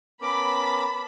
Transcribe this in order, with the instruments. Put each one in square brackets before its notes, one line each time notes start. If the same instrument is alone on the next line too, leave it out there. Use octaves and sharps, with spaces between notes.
[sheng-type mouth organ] B3 C#4 A#4 [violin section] A5 B5 [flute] D6